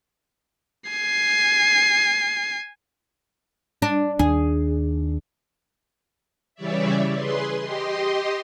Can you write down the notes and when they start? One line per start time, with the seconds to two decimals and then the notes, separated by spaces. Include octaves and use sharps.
0.90 G#5 C7
3.82 D4
4.19 D#2 D4 G#4
6.55 C#3 E3 G3 C#5 D5 E5
7.13 G#4 B4 C6
7.60 G4 D#5 C6